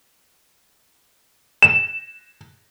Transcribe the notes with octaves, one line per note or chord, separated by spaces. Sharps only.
E7